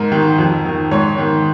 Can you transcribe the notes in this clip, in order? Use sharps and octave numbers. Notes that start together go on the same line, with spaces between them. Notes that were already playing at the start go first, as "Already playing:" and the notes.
Already playing: G#2 A#4
D#3
F2
D#3
G#2 C#5
D#3